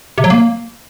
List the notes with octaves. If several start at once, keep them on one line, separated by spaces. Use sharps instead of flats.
C3
F#3
A#3